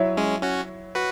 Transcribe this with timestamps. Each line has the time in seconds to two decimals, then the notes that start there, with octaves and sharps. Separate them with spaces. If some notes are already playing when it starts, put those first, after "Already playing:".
Already playing: F#3 E4 C#5 E5
0.17 G#3 C#4
0.43 C#4 F#4
0.95 F#4 B4